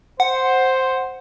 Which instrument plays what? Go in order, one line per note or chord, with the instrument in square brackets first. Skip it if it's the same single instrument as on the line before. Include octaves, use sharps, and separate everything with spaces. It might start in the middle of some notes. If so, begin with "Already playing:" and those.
[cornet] C5 [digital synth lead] F#5